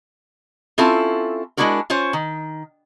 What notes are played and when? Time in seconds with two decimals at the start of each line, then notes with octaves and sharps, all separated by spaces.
0.78 C4 C#4 E4 F4 A4
1.57 G#3 C#4 D4 E4 F#4 A#4
1.90 C#4 F4 C5 C#5
2.13 D#3